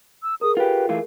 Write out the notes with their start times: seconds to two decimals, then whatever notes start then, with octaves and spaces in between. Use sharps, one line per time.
0.23 E6
0.41 G#4 A#4 D#6
0.57 F4 G4 B4
0.89 E3 A3 F4 F5